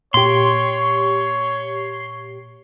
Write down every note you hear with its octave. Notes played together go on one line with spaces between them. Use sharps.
A#2 G4 C#5 C6